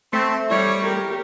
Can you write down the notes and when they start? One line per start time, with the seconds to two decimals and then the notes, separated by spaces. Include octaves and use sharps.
0.13 A3 C4
0.51 G3 C#5
0.85 G4 A#4